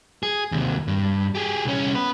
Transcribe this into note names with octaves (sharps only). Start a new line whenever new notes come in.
G#4
D#2 C3
G2
G4 G#4
C2 C#4
B3 B4